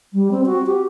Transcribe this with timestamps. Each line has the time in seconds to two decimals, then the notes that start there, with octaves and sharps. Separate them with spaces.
0.13 G3
0.31 C4
0.46 F#4
0.66 G4